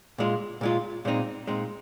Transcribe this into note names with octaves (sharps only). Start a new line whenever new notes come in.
A#2 G#3 F4
A#2 G#3 F4
A#2 G#3 C4 D#4
A#2 G#3 C4 D#4